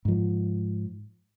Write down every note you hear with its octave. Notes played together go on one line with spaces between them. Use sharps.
G#2 F3